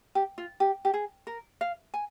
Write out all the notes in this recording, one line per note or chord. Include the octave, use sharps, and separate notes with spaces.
G4
F4
G4
G4
G#4
A#4
F5
G#5